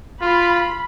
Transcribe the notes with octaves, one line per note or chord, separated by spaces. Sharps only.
F4 B5